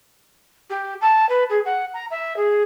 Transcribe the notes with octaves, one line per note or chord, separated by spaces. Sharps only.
G4
A5
B4
G#4
F#5
A#5
E5
G#4